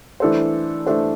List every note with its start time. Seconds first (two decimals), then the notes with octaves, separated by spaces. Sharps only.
0.20 E3 A3 D4 A4 C5
0.86 E3 A3 D4 A4 C5